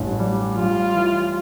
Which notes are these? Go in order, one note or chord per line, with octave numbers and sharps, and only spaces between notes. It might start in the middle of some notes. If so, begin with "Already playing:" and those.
Already playing: A1 G2
G3
G3 F4
E3